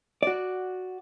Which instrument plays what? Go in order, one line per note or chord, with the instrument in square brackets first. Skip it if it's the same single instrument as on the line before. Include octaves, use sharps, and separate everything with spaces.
[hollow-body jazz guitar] F#4 D5